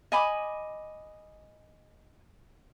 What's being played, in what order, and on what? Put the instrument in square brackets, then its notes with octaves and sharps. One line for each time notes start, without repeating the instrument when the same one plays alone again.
[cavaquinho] D#5 G#5 B5 D6